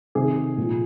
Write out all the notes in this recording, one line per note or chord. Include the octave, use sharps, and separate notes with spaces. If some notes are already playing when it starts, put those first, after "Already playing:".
C3 D#3 G#4
A#2 F3